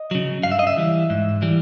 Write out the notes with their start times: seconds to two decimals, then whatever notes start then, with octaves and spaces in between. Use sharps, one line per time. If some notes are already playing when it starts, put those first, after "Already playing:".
Already playing: D#5
0.11 C#3 F#3
0.43 G2 F5
0.52 E5
0.59 D#5
0.67 E5
0.77 E3 G3
1.10 G#2
1.42 E3 G3